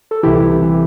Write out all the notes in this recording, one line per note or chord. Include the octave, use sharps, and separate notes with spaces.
A4
C2 C3 E3 E4 G4
C2 C3 E3